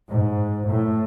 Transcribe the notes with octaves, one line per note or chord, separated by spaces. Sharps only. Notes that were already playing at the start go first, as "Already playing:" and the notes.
G#2
A2